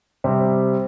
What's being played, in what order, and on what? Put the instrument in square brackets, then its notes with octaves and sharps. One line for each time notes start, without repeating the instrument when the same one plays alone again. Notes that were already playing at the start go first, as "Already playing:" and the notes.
[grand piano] C3 G3 C4